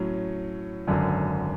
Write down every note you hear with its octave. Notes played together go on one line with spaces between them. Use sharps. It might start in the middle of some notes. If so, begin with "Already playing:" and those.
Already playing: A2 F#3 C#4
G#1 F#2 D3